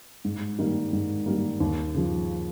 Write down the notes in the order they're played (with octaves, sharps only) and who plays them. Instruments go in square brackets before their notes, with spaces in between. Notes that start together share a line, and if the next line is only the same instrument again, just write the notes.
[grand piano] G#2
D#3 G3 A#3
G#2
D#3 G3 A#3
D#2
C#3 F3